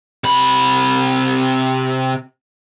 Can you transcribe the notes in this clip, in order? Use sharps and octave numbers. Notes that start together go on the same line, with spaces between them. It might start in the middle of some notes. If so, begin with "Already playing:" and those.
C3 B5